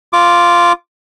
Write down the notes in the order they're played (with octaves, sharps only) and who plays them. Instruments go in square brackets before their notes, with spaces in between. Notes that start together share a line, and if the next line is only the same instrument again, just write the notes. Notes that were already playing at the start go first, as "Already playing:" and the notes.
[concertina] F4 D6